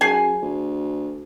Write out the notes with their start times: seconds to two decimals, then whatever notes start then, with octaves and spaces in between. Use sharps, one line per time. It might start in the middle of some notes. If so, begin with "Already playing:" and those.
0.01 F#2 G#4 G#5
0.42 D2